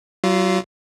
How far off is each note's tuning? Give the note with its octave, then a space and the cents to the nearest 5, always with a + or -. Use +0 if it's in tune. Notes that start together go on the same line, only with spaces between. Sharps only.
F#3 +35 F4 -10